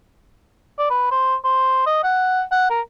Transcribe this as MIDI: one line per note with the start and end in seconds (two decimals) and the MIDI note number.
0.79 0.87 74
0.90 1.10 71
1.11 1.35 72
1.44 1.84 72
1.86 1.99 75
2.04 2.43 78
2.52 2.68 78
2.70 2.81 70